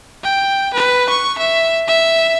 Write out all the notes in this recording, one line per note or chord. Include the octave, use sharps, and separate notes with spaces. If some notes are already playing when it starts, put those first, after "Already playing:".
G5
B4
C#6
E5
E5